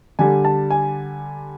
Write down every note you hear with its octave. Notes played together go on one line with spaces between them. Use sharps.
D3 G3 G#5
A5
G#5